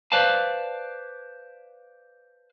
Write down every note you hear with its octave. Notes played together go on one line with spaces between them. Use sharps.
B4 C5 D5 F5 A5